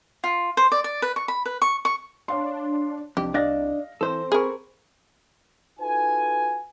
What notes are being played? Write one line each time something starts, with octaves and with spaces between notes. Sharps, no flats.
F4
C5
D5
D5
B4
C#6
B5
B4
C#6
C#6
D4 C#5 F5 C6
C2 F2 D4 G4
D4 D5 D#5 F5 A#6
E3 C4 A4 C5
G#4 A#4 B5 C#6
D#4 F4 F#4 A4 B4 G#5